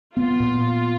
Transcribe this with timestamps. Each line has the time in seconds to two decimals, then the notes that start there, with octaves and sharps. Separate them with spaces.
0.17 B3 F4
0.40 A#2